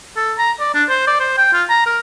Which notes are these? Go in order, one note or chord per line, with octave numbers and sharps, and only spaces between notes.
A4
A#5
D5
D4
C5
D5
C5
G5
F4
A#5
A#4